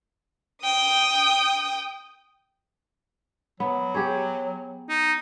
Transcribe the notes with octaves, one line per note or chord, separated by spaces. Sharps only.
G5 D#6
F#3 B3
G4 G#4 C#5
D#4